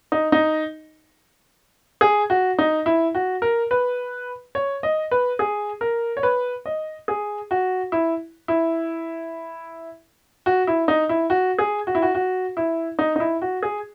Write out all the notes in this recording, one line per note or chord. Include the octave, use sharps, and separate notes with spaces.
D#4
D#4
G#4
F#4
D#4
E4
F#4
A#4
B4
C#5
D#5
B4
G#4
A#4
C#5
B4
D#5
G#4
F#4
E4
E4
F#4
E4
D#4
E4
F#4
G#4
F#4
E4
F#4
F#4
E4
D#4
D#4
E4
F#4
G#4